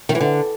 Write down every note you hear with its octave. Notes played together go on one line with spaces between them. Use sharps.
D#3
E3
D3